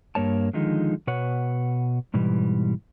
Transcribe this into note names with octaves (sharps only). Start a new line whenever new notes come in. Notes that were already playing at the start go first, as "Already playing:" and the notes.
G2 A#3 C#5 A5
D3 D#3 F3 G#3 D#4
B2 B4 C#5 F#5
G#2 B2 E3 G3